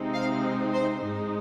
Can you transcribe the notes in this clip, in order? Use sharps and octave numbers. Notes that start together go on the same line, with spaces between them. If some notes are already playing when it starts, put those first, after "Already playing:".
Already playing: C3 G#3 C4 D#4
F5
C5
G#2 G#3 D#4